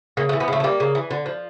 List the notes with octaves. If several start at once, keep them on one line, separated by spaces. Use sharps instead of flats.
C#3 A#3
A3
E3
B3
C#3 A3
A3
G3 A#3
C#3
E3
D3
F3